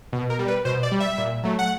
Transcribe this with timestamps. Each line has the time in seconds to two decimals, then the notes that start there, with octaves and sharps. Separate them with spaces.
0.13 B2
0.30 A#4
0.39 G3
0.48 B4
0.65 B2 C5
0.83 D5
0.92 G3
1.00 E5
1.18 A#2
1.44 F#3 A3
1.59 F#5